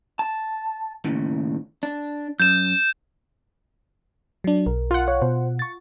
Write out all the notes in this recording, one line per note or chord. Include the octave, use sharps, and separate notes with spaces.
A5
D#2 A2 C#3
D4
F#2 G6 E7
F#3 D4
B1 A#4
F4 F#5
C#5
B2 C5
C#6 A6